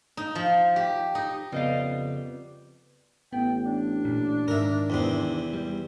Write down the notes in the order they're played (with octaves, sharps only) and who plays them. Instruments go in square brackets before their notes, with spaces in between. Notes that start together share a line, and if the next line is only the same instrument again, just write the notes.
[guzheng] D#4
F3
G4
D#4
[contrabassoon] F2 [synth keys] C#3 [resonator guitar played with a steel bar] G3 D#5 F5 [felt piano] B3
[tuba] A1 [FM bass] B3 [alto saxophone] G5
[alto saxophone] D4
[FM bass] A#2
[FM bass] G#2 [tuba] D#3 [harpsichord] A#4 E5
[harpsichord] E2 C3 C4
[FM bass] G3